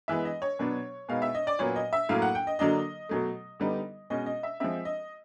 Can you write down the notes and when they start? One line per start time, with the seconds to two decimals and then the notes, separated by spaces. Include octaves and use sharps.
0.08 E3 G#3 B3 E5
0.25 D#5
0.42 C#5
0.59 B2 F#3 B3 D4
1.09 B2 G#3 B3 D#4 F5
1.22 E5
1.35 D#5
1.47 D5
1.59 A#2 F#3 B3 C#5
1.76 D#5
1.93 E5
2.09 A2 F#3 A#3 F5
2.22 F#5
2.35 G5
2.47 D#5
2.59 D3 F#3 A#3 D4 D#5
3.09 B2 F#3 A3
3.60 D3 G3 B3 D#4
4.10 B2 G#3 C#4 D#5
4.26 D#5
4.43 E5
4.60 F3 G#3 C4 E5
4.85 D#5